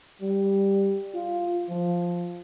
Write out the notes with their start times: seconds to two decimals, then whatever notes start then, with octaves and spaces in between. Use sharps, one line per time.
0.22 G3
1.14 F4
1.69 F3